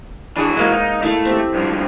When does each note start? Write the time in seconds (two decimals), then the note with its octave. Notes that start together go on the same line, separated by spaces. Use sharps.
0.36 E3 D4 F#4 G#4
0.55 G#2 G#3 A#3
0.72 D#4
1.03 A3 E4 A4 F5
1.25 C4 G4 E5
1.54 G2 F3